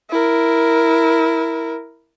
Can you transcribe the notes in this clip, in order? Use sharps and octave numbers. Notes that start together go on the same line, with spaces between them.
E4 A#4